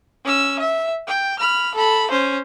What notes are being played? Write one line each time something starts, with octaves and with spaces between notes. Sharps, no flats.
C#4 E6
E5
G5
B5 F6
A4 B5
C#4 C5